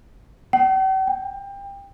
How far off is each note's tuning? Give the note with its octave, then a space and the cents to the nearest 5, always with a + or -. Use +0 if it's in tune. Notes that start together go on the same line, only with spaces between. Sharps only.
G5 -45
G5 +25